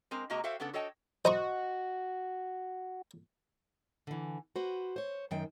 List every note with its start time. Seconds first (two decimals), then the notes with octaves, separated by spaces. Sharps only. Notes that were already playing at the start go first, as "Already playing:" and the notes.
0.11 G#3 C4 A#4
0.30 C3 G#3 A#3 F#4 D#5 A#5
0.44 F#4 A4 C5 E5 F5 G5
0.60 C#3 B3 D4 A4 F#5
0.73 F#4 A4 C#5 D#5 G5 A5
1.25 F#4 C5 D#5 A#5 C#6
4.07 D3 E3
4.56 F#4 B4 C5
4.96 C5 C#5
5.31 F#2 D#3 G5